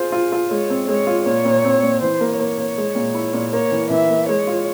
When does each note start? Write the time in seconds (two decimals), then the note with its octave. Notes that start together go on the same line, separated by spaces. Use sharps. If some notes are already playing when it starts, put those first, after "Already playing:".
Already playing: F4 G#4 C5
0.12 F4
0.32 F4
0.50 G#3 C#5
0.70 C4
0.88 G#3 C#5
1.07 F4
1.26 A#2 C#5
1.45 A#2
1.64 C4
1.82 A#2
2.01 E3 C5
2.20 A#3
2.39 A#3 C#5
2.58 A#3
2.77 G#3
2.95 A#2
3.14 E4
3.33 A#2
3.52 A#3 C#5
3.71 E3
3.90 E3 E5
4.09 A#3
4.28 G#3 C#5
4.47 F4